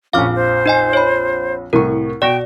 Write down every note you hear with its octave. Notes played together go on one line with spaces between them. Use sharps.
A#1 F2 C#4 F5 D6 F6
C5
D#4 D#5 G#5
C#5 B5
C2 A2 A#4 C#6
B2 D5 G5 C#6 A#6